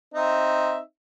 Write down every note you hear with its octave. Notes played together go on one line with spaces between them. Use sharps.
C4 D#4 E5